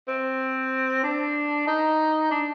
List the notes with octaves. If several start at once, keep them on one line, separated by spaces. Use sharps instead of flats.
C4
D4
D#4
D4